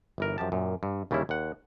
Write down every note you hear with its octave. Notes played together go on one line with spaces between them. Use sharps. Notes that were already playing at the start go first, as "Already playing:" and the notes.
G1 E3 A#4
F#2 F3 G4 A5
F#2 A#2
G2
D#2 C#3 G3 A#3 E4
D#2 F#5